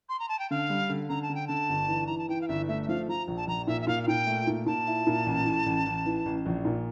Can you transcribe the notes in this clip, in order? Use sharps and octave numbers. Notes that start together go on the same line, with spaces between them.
C6
A#5
A5
G5
D3 F5
G3
D3
D3 A#5
A5
D3
G5
D3 A5
G1
E3
E3 A#5
A5
E3 G5
F5
G1 E5
A3 E5
E5
F3 F5
F3 A#5
A#1
A5
A#1 A#5
A#2 E5
E5
A#2 F5
F5
A#2 G5
A3
A#2
A#2 A5
E4
A#2
A1
A2
A1
A1
E3
A1
A#1
A#2